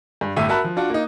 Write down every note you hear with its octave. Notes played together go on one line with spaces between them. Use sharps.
G2
G1 A2 A3 E5 D#7
F#4 A#4 E5 A5 B5 F#6
F3
D4 F4 F#4
A#3 D#4